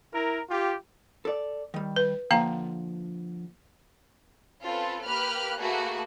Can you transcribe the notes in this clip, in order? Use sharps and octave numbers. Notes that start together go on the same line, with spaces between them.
E4 A#4
F4 G4
A4 D5
D#3 G3
B4
D3 F3 A#3 F5 A#5
C4 C#4 F4 A4 B4
A#3 G4 B4 B5 F6 F#6
A3 A#3 F#4 G#4 B4